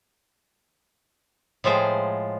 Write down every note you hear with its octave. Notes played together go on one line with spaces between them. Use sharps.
A2 F3 G#3 C5 G5